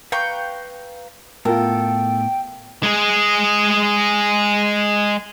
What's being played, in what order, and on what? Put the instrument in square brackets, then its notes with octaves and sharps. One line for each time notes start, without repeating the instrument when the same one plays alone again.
[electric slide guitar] B4 F5 A#5 [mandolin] G5 C#6
[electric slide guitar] A2 B3 [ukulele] F4 A#4 [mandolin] A4 [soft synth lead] G5
[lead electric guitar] G#3 G#4